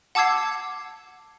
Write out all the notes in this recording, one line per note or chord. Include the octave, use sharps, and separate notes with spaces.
F#5 A5 D6 E6 G#6 C7